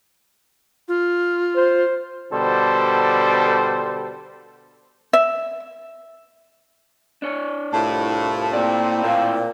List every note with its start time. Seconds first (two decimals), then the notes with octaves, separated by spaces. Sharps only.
0.88 F4
1.56 C5
2.32 B2 D3 G3 A4 C5
5.13 E5
7.22 D4 C#5
7.73 C2 A2 F4 A5
8.53 A#3 C4 D5
9.02 A#2 E4 C5 F5